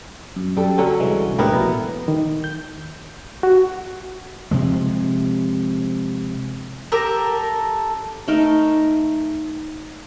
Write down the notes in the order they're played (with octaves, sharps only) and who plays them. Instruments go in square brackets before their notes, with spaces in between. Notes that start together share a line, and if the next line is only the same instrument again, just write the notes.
[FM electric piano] F#2
[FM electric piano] F#2 [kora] G3 A4
[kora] D3 F#3 C#4
[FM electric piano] C2 E3 G#3
[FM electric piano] A2 D3 G4 [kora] B3 E4 A#4
[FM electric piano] A#1 B2
[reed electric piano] D#3
G6
F#4
[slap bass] C3 F3 G#3
[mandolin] G4 A4 A#4
[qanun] A3 D#4 A#4